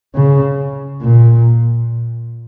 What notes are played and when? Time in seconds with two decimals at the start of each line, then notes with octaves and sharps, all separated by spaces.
0.15 C#3
1.01 A#2